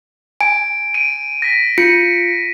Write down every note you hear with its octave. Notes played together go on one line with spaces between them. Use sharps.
G#5 D7
D7 D#7
A#6 B6
F4 C#7